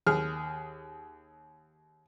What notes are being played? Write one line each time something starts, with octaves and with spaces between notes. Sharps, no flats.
D#2 G#4 F6